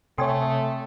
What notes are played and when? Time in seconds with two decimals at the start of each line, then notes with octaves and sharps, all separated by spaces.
0.18 C3 A3 A4 C#5 G5 G#5 C6